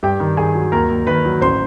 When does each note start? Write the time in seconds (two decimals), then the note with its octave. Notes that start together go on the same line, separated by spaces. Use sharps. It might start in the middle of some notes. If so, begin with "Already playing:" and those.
0.03 G2 G4 G5
0.20 D#3
0.37 D#3 G#4 G#5
0.55 F#3
0.72 D#2 A#4 A#5
0.90 D#2
1.07 D#3 B4 B5
1.25 F#3
1.41 A1 C5 C6